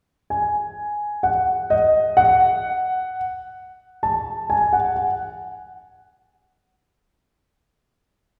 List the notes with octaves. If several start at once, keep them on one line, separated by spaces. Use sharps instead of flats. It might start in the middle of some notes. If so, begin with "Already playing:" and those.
G#5
F#5
D#5
F#5
A5
G#5
F#5
F#5